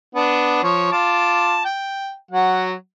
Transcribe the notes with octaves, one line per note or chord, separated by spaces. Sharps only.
B3 D4
F3 C#5
F4 A5 D6
G5
F#3 F#5